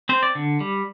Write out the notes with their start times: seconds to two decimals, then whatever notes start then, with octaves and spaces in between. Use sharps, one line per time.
0.09 C4 C5
0.23 D5
0.35 D3
0.60 G3